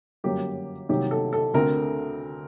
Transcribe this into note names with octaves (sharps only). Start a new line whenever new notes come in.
G1 F#2 F#3 A#3 G4
C2 C3 D#3 F#3 A#3 G4
A4
A4
D2 D3 A3 C4 A#4